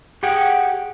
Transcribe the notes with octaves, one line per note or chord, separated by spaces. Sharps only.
G4 G#4 F#5 G5